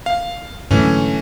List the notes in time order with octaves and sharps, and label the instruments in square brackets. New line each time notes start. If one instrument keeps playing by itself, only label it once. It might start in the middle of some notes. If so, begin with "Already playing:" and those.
[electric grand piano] F5
[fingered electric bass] G#2 D3 F#3 [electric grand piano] E3 A3 C#4